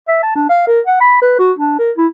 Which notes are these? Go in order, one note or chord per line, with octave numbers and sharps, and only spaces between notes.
E5
A5
D4
F5
A#4
F#5
B5
B4
F#4
D4
A#4
E4